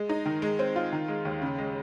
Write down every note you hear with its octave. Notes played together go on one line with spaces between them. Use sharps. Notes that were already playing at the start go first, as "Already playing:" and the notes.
Already playing: G#3
D#4
D#3
G#3
C4
F4
D#3
G#3
D#2
C#3
G#3